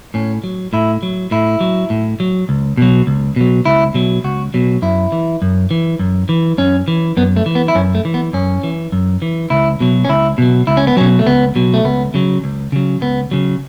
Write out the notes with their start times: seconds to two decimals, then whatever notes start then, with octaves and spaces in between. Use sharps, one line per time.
0.14 A2 C#4
0.44 F#3
0.73 A2 E4
1.03 F#3
1.31 A2 E4
1.61 F#3
1.90 A2
2.20 F#3
2.49 C#2
2.77 B2 F#3
3.07 C#2
3.36 B2 F#3
3.66 C#2 E4
3.94 B2 F#3
4.24 C#2 F#4
4.54 B2 F#3
4.82 F#2 E4
5.12 E3
5.42 F#2
5.71 E3
5.99 F#2
6.29 E3
6.58 F#2 C#4
6.88 E3
7.17 F#2 B3
7.36 A3
7.46 E3
7.55 B3
7.68 E4
7.75 F#2 C#4
7.95 A3
8.05 E3
8.14 B3
8.33 F#2 C#4
8.63 E3
8.92 F#2
9.22 E3
9.50 C#2 E4
9.80 B2 F#3
10.05 C#4
10.09 C#2 E4
10.38 B2 F#3
10.67 C#2 E4
10.77 C#4
10.87 B3
10.97 B2 F#3 C#4
11.19 A3
11.26 C#2 B3
11.56 B2 F#3
11.74 A3
11.84 C#2 B3
12.14 C#3 F#3
12.44 C#2
12.72 C#3 F#3
13.01 C#2 B3
13.31 C#3 F#3